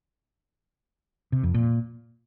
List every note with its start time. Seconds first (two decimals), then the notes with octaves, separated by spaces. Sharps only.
1.32 C3
1.43 F2
1.54 A#2